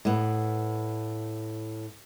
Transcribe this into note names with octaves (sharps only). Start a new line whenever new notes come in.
A2 B3